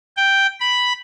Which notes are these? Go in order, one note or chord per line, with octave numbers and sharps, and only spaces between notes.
G5
B5